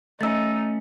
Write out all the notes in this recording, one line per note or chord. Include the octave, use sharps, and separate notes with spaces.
A3 C#4 D#4 E6 A6